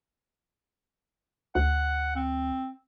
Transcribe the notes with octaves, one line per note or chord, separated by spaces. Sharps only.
D2 F#5
C4